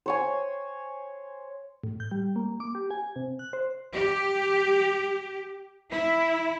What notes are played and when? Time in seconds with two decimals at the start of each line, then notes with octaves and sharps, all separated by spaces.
0.06 C5 C#5 G#5
1.84 A2
2.00 G6
2.11 G3
2.36 A#3
2.60 D6
2.75 G4
2.91 G#5
3.16 C3
3.39 F#6
3.53 C5
3.95 G4
5.91 E4